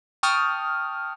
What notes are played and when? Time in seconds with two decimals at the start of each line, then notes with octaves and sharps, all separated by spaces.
0.23 G5 A5 C#6 D#6 F6